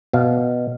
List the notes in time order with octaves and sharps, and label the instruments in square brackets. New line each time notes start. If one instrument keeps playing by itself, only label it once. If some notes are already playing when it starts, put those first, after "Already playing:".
[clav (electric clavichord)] B2 F5